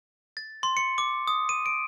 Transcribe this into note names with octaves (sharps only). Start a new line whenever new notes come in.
A6
C6
C#7
D6
D#6
D#7
D7